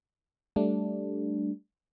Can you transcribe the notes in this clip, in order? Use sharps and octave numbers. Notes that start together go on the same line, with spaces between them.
G3 A3 D4